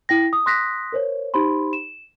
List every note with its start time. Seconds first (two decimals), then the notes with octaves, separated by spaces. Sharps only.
0.09 E4 G5 A#6
0.33 D#6
0.46 C6 D#6 F#6 A#6 B6
0.92 A#4 C5 C#5
1.34 D#4 G4 C5 B5 C6
1.73 E7